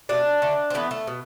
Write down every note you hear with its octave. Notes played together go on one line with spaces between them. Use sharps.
B2 A3 D4
D3 A3
C4
A2 E3 A3 B3
A3
B2